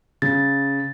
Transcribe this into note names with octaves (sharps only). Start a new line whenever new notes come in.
C#3 A6